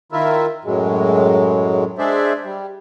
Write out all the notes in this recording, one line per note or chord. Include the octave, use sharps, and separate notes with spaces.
D#3 E4 F4 A#4 E5
F#2 A2 F#3 G#3
G#3 D4 G#4 C5 D5 E5
G3